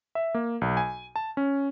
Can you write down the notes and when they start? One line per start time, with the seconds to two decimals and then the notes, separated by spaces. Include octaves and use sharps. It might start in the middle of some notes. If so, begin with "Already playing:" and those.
0.15 E5
0.34 A#3
0.61 B1
0.77 G#5
1.16 A5
1.37 C#4